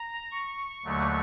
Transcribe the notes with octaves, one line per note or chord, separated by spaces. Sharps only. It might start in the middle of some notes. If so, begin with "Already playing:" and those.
Already playing: A#5
C#6
D#2 D3 F#3 A3